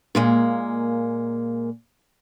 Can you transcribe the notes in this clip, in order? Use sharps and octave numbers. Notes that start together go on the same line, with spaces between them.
A#2 G#3 A#3